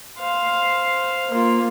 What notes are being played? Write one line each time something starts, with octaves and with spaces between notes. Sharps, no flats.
C5 F5
A#3 F4